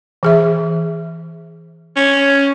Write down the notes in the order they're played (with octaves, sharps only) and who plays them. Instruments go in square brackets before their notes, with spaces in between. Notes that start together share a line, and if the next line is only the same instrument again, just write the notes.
[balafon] E3 G#4 E5
[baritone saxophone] C#4